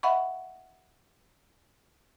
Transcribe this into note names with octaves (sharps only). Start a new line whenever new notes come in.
D#5 E5 F#5 B5 C#6